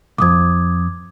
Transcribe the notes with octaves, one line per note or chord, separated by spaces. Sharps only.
B1 F2 D6 D#6 G#6